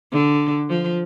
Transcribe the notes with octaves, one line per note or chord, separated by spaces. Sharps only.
D3
F3